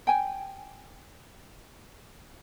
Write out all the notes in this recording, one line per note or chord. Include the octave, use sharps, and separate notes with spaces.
G5 G#5